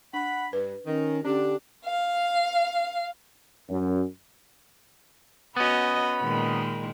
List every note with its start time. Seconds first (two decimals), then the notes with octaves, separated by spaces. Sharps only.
0.13 D4 F#5 B5
0.53 G2 B4
0.86 D#3 C#4
1.25 D3 C#4 D4 G4
1.85 F5
3.68 F#2
5.56 B3 C#4 F#4 D#5 B5
6.21 A#2 D#3 G#3